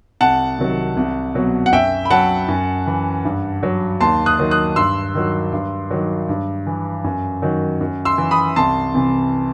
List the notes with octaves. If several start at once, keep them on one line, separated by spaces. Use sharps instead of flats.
C2 F#5 A5
C3 D#3 F#3
C2
B2 F#3
F#5
F#2 E5 G5
B5
F#3 F#5 A5
F#2
E3
G2
F#3
D#2 A5 C6
D#6 F#6
D#3 F#3
D#6 F#6
G2 C6 E6
D#3 F#3
G2
D#3 F#3
G2
E3
F#2
D#3 F#3
F#2
C6 E6
E3
B5 D#6
C2 A5 C6
C3 E3